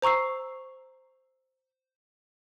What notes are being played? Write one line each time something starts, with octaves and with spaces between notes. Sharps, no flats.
C5 A#5 C#6 E6 C7